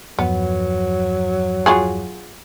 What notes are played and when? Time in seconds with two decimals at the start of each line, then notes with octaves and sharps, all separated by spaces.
0.19 E2 G2 F3 F#3 B3
1.66 F4 F#4 G#4